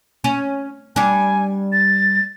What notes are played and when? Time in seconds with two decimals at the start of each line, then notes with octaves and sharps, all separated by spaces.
0.24 C#4
0.96 G3 D4 G#5
1.72 A6